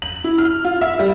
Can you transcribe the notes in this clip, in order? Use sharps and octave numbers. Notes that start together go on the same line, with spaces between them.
F#7
E4
F6
F4
E5
G3